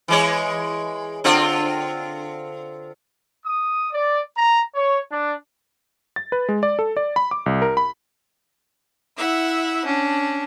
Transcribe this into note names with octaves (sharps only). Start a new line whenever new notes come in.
E3 G#3 C#5
D3 C4 F4
D#6
D5
A#5
C#5
D4
A6
B4
G#3
D5
A4
D5
B5
D6
C2
A#4
B5
E4 E5 F#5
C#4 D4